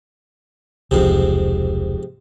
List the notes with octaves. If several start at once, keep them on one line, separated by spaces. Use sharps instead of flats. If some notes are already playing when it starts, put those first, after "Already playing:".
E1 C2 F2 G#2 C3